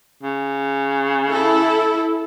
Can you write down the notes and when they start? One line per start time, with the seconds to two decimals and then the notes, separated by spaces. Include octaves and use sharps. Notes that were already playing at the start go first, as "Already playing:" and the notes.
0.23 C#3
1.29 E4 A4